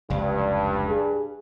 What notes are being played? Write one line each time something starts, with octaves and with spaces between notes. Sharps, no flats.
F1 C#2 G2
G#4